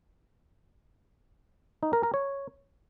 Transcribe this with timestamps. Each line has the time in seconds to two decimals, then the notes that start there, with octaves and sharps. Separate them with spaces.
1.83 D#4
1.93 A#4
2.03 A#4
2.14 C#5